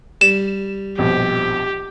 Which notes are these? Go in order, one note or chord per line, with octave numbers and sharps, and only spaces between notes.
G3 E7
A#1 F2 B2 G4